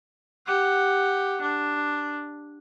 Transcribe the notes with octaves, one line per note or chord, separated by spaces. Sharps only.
G4 F#5
D4